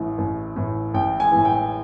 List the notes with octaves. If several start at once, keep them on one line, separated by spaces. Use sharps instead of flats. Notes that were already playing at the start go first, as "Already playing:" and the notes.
Already playing: A1 A2 E3
A1
A2 E3
A1 G5
G#5
A2 E3
G5